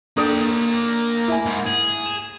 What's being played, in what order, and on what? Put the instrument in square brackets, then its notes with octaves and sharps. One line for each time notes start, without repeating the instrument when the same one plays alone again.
[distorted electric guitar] A#3 G5 [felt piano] D4 A4 D#6
[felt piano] E4 G#5
[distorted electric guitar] G#2
G#4
[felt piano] E7